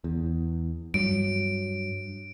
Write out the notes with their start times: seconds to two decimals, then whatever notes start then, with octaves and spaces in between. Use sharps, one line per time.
0.04 E2
0.94 G2 F#3 D7